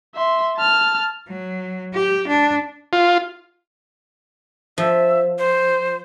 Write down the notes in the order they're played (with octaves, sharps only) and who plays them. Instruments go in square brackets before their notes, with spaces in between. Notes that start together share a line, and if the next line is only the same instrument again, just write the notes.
[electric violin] E5 C6
A5 F6
[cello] F#3
G4
D4
[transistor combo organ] F4
[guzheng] F3 [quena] E5
[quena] C5